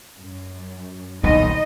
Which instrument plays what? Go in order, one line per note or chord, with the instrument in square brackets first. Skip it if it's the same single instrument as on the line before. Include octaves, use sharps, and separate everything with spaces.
[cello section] F#2
[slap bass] D#1 B1 A2 [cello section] D#4 D#5